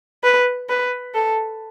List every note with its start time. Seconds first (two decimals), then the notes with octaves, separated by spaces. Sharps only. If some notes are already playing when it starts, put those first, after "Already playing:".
0.24 B4
0.69 B4
1.14 A4